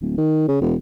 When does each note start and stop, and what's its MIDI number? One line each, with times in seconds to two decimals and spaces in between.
0.01 0.15 26
0.18 0.47 51
0.48 0.58 49
0.61 0.75 28